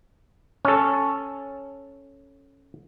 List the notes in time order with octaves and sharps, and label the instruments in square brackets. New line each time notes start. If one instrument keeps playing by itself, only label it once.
[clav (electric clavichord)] C#4 A4